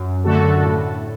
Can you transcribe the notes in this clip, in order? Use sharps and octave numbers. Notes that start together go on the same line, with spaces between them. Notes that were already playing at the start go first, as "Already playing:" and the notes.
Already playing: F#2
D3 A3 F#4 A4
A2